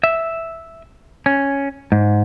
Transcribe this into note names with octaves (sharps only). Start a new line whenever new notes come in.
E5
C#4
G#2